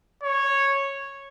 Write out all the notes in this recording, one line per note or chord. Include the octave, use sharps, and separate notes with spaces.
C#5